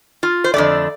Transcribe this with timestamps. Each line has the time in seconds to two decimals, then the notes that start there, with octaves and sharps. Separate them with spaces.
0.23 F4
0.44 C5
0.54 F2 D3 A3 D5